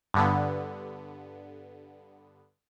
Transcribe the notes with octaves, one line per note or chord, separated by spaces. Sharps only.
G2 D3 B3